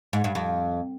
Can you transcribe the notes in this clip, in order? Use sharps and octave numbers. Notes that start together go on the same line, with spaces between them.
G#2
G2
F2